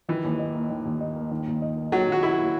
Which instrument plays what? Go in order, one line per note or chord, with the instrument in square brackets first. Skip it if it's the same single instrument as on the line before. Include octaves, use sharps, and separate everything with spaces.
[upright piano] D#3 [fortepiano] E3
[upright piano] D#2
D#4
A#3
D#3
D#2
D#4
A#3
D#3
D#2
D#4
A#3
[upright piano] D#3 [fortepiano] F#3
[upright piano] D#2 [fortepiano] F#4
[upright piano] D#4 [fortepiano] E4
[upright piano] A#3